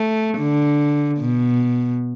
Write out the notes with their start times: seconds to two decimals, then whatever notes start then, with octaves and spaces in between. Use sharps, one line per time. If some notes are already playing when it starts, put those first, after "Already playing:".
Already playing: A3
0.38 D3
1.19 B2